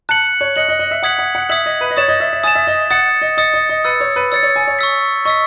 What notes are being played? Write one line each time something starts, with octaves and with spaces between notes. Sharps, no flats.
A5 F#6 C#7 F#7
C#5
D#5 F#6 C#7 F#7
D#5
D#5
E5
F#5 D#6 G#6 B6 F#7
F#5
F#5
E5 D#6 G#6 B6 F#7
D#5
B4
D#5
C#5 D#6 A6 E7
D#5
E5
E5
G#5 D#6 A6 E7
E5
D#5
F#5 D#6 A6 C#7
D#5
D#5 D#6 A6 C#7
D#5
D#5
B4 E6 A6 C#7
C#5
B4
C#5 E6 A6 C#7
C#5
G#5
C#5
C#6 E6 B6
D#5 C#6 E6 B6